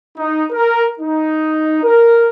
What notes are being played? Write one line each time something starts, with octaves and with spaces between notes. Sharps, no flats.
D#4
A#4
D#4
A#4